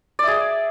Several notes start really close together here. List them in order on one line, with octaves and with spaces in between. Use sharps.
D5 E5 G#4